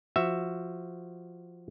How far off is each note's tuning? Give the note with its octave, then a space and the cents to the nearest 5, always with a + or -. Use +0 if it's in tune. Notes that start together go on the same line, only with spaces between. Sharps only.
F3 -5 F#4 +0 E5 +5